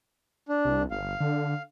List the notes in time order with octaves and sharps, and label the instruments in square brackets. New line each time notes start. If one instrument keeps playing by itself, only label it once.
[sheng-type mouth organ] D4
[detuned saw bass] C2
[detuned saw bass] G1 [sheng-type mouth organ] F5
[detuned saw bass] D3